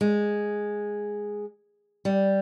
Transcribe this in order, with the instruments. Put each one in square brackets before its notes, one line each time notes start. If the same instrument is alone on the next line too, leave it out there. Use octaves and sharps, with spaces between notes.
[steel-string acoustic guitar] G#3
G3